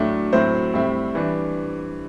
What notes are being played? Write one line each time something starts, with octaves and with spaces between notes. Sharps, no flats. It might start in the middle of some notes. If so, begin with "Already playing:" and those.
Already playing: A2 F#3 A3 D4
A2 F#3 C4 E4 C5
A2 G3 C4 E4
E3 G3 D4